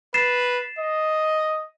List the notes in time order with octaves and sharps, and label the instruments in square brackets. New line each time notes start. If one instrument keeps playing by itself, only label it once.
[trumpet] B4 [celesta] A6 C7 E7
[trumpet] D#5